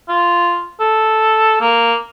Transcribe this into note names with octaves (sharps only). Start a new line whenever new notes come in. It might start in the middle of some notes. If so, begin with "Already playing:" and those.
F4
A4
A#3